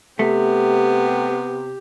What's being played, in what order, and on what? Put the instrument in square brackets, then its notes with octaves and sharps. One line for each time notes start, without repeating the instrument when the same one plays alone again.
[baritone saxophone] C3 [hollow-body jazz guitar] A3 [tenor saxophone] B3 [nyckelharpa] G4